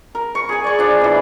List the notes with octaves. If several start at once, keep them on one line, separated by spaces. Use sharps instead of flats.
A#4
C#6
G#4 G#5
D5 C#6
F3 D4
B2 E3